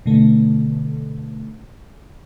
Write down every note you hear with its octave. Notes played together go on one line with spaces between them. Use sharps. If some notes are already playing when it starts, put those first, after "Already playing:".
B2 D3 A3